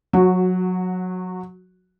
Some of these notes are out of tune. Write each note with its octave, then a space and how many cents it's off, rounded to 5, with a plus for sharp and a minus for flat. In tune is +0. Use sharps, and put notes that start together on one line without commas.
F#3 -20 F#4 +0